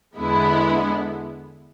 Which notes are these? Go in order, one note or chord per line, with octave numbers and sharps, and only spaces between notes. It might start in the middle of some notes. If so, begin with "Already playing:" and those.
E2 D3 G#3 B3 E4